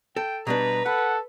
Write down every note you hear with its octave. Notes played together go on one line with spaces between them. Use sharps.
A4 G5
B2 G3 D4 B4 A#5
A4 F#5 B5